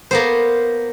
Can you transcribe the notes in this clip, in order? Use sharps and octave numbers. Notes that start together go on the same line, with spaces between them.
A#3 B3 C5